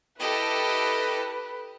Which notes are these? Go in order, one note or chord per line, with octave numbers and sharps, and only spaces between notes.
E4 G4 A4 B4 D#5